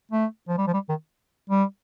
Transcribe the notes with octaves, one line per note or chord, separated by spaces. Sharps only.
A3
F3
G3
F3
G3
D#3
G3